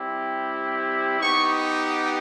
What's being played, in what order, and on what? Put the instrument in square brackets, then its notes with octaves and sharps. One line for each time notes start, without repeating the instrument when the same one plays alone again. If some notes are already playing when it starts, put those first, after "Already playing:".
Already playing: [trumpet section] G3 C4 E4 G4
B3 D#4 G4 C#6